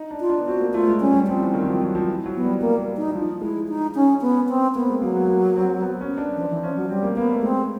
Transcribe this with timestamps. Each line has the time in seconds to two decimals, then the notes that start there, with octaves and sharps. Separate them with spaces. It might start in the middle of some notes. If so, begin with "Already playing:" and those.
Already playing: D#4
0.11 D4
0.20 F4
0.30 D4
0.40 B3
0.47 C4 F#4
0.60 A#3
0.74 A3 F4
0.88 G#3
1.01 G3 C#4
1.14 G3
1.28 F3 C4
1.40 E3
1.54 D#3
1.62 F#3
1.67 F3
1.82 F#3
1.95 F3
2.08 E3
2.26 F#3
2.35 B3
2.44 G3
2.61 G3 A#3
2.97 D#4
3.10 E3
3.15 F3
3.42 G#3 E4
3.68 D#4
3.95 C#4
4.22 B3
4.49 C4
4.75 A#3 B3
4.89 G#3
5.02 F#3 A#3
5.16 B3
5.29 A#3
5.56 C4
5.82 B3
6.01 C#4
6.18 D4
6.36 F3 D4
6.50 E3
6.55 C4
6.62 F3 C#4
6.76 F#3
6.89 G3 C4
7.03 A#3
7.16 A#3 B3
7.30 A3
7.42 G#3 C4